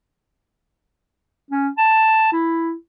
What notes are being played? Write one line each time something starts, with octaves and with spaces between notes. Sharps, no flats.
C#4
A5
E4